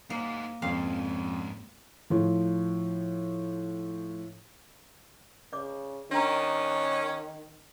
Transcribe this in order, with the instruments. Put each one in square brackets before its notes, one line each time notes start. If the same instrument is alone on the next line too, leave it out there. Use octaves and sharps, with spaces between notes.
[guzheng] A#3 [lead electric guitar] D#4 C5
[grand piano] F2 [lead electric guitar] G#2 C#4 [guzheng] F5
[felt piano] A2 F3
[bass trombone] C#3 [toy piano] D5 D6
[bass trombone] D#3 [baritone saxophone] C#4 [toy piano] D4 A#5